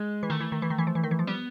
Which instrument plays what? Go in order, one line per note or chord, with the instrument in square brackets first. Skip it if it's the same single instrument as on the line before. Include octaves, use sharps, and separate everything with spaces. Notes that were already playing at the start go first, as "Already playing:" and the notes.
Already playing: [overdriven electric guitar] G#3
[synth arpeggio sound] E3
[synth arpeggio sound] D#3 [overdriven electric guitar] A3
[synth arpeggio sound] E3
D#3
E3
D#3
E3
F3
E3
D#3
E3
F3
[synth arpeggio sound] G3 [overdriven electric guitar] B3